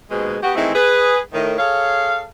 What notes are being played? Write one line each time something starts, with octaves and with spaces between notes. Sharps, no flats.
D#2 G#2 B2 G#3
B3 F#4 G4
D#3 E3 G#3 A3 C4 E4
G#4 B4
A2 D#3
G#4 A4 C#5 F5